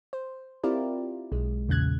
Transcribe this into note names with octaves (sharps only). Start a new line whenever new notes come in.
C5
C4 E4 F4 G4 A#4 D5
B1 G#3
E2 A#2 C#3 F#6 G#6